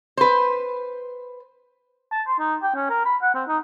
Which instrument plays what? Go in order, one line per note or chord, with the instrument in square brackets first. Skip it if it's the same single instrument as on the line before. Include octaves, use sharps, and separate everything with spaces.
[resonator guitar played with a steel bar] B4 C5
[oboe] A5
C6
D#4
G5
C#4
A#4
B5
F#5
C4
D#4